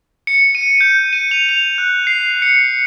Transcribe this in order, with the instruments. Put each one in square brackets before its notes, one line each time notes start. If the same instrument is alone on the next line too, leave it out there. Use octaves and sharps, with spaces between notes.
[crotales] C#7
D#7
G6
D#7
F7
F7
F#6
C7
C#7